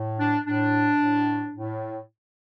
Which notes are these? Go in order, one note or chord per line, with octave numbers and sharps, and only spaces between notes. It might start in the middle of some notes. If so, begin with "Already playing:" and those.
Already playing: A2
D4
A2 D4
A2
A2